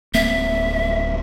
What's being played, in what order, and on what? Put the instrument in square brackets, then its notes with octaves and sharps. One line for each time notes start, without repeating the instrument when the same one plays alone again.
[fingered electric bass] D1 A#3 C4 [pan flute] E5